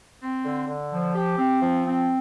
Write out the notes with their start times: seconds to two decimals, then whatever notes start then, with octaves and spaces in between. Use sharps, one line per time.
0.22 C4
0.45 D3
0.68 D3
0.92 F3
1.15 G4
1.38 C4
1.62 F3
1.86 C4